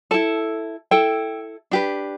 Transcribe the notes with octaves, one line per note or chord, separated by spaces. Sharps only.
E4 A4 A5
E4 A4 G5
D4 G4 B4